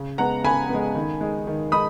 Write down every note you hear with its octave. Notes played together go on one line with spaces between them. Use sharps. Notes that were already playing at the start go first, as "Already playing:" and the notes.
Already playing: C#3
G#3 B3 F#5 A#5
C#3 G#5 B5
G#3 B3
D#3
G#3 D#4
D#3
G#3 D#4 B5 D#6